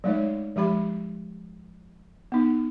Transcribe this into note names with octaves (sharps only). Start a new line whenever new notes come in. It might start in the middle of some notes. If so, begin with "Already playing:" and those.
F#3 G#3 A3 D#4 C#5
F3 G#3 G4 B5
B3 D#4